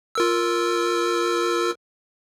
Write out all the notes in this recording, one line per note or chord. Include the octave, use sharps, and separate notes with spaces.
F4 A#4 E6